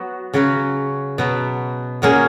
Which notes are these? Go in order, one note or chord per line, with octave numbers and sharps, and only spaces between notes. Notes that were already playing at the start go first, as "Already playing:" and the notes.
Already playing: F#3 B3 F#4
C#3 F#3 C#4 F#4
B2 F#3 B3
A#2 F#3 A#3 C#4 G#4